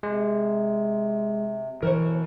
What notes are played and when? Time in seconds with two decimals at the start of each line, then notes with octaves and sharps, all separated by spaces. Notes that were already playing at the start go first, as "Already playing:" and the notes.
0.03 C3 G#3
1.83 B2 E3 A#4 C5 C#5